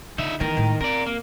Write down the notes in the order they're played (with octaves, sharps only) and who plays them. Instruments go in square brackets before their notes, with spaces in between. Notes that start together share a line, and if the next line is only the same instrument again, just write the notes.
[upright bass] D3 [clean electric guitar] D#4 E5
[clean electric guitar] D#3 A#4 [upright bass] E3 B3
[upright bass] A2 G#3
[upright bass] C4 [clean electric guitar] A#4 D5
[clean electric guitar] A#3